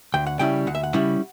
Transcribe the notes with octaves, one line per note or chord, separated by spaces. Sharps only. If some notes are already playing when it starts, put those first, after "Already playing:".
D2 G5
F#5
C#3 G3 C#4 E4 G5
D2 F#5
E5
F#5
C#3 G3 C#4 E4